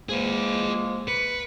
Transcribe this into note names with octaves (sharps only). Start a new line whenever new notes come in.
F3 G#3 A#3 G#4 B4
B4 C#7